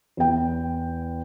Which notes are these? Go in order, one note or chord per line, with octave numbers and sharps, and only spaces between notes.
E2 G5